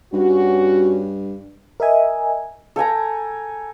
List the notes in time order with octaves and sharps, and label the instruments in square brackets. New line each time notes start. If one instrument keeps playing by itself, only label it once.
[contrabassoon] G2 [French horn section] C#4 F#4
[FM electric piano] A#4 D#5 E5 G#5
[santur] A4 G5 G#5 A#5